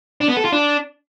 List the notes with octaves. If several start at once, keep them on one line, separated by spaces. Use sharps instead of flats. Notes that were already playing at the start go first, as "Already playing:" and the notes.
D4
B3
A4
F4
D4